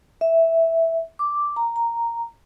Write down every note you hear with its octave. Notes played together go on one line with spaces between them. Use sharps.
E5
D6
A#5
A#5